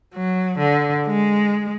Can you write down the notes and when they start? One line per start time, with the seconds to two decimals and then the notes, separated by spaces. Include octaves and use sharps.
0.14 F#3
0.59 D3
1.06 G#3